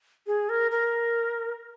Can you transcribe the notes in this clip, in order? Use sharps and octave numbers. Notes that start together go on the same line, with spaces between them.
G#4
A#4
A#4